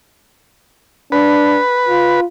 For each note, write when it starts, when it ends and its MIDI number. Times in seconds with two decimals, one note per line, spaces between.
1.12 1.61 62
1.12 2.20 71
1.89 2.25 65